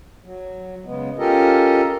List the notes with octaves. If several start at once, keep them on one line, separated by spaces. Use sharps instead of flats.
F#3
C#3 G#3 B3
C#4 F4 G4 A4 A#4 D#5